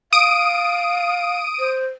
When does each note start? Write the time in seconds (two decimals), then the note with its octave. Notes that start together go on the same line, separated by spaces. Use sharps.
0.13 F5 D#6 D7 D#7
1.59 C5